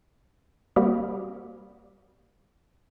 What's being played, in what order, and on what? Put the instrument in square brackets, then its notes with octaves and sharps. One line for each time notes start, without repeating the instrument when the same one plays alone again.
[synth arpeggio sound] G3 A#3 C4 F#4 G4